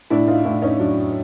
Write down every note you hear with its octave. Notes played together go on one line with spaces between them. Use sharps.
A2 D4 E4
D#4 F4
A2 D4 E4
C#4 D#4
F#3 D4